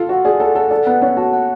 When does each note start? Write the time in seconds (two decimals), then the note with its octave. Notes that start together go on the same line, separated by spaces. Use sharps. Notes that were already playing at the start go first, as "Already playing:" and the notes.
Already playing: F4 A4
0.09 F#4 F#5
0.25 G#4 D5
0.40 A4 F#5
0.55 A4 F#5
0.71 A4 D5
0.86 B3 F#5
1.02 C#4 F#5
1.17 F#4 A5
1.33 F#5